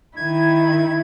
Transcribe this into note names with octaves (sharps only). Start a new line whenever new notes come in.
D#3 E4 G#6